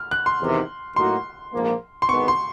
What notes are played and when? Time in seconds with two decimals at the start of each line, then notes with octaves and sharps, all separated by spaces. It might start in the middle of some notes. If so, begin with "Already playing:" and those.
Already playing: F6
0.11 F#6
0.26 C6
0.40 E2 C3 D#3
0.96 A2 F#3 A#3 D#4 F#4 C6
1.53 A#1 G#2 F3 A#3
2.02 C6
2.09 G#1 G2 D#3 G#3 B3 C#6
2.28 C6